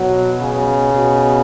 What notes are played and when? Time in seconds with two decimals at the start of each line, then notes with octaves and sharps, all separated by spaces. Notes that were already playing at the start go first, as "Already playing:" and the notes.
Already playing: B2 F#3
0.41 C#3
0.95 B2